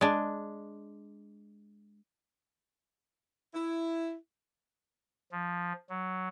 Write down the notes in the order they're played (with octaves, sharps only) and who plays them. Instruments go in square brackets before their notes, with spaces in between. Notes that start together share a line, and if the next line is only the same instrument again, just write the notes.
[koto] G#3 D4
[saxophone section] E4
[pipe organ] F3
F#3